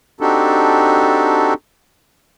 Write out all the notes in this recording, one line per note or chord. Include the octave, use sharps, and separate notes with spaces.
C4 D4 D#4 F#4 G4 A4